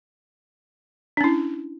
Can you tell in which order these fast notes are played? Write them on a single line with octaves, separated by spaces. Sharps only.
D4 C#4 E4